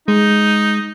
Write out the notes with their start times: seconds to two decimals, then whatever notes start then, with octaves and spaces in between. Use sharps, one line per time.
0.08 G#3 D#4